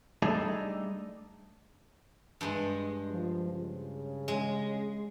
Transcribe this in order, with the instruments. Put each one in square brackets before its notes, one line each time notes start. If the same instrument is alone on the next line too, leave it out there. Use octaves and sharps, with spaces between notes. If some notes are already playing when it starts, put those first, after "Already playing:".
[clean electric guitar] G3 A3 D4 D#4 G#4 A4
[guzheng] G2 G#3
[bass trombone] F3
C#3
[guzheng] G#3